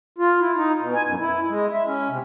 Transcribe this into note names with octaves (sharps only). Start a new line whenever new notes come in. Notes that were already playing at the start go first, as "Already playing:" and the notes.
F4
E4
D#4
B2
G#5
F#2
E4
G#3
E5
C#4
C3